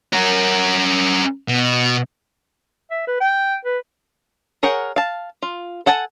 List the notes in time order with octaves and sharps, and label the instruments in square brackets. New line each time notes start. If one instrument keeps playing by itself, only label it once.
[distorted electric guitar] C#4 A#4
B2
[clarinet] E5
B4
G5
B4
[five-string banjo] G#4 A#4 C#5 F#5 G5
F5 A5
F4
A4 F#5 G#5 A5